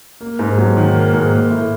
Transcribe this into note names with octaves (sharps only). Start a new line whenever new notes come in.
A#3
G#2
F#3
D#3
A#3
G#2
A#3
A2